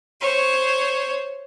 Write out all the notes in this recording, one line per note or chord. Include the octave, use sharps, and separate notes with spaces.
C5 C#5